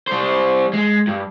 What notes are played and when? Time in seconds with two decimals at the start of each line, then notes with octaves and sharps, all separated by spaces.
0.07 G3 C5
0.73 G#3
1.07 G2